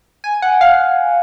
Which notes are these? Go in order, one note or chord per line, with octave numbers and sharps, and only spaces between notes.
G#5
F#5
F5